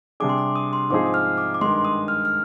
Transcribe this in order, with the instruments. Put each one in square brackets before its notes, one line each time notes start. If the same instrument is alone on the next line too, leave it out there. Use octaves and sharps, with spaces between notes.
[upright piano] C3 G3 D4 G#4 [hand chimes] D6
[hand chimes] C6
D6
D#6
C6
[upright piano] G#2 F3 C4 D#4 G#4 [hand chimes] D6
[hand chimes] D#6
F6
D6
D6
[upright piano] G2 D#3 G#3 [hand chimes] C6
[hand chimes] D#6
F6
F6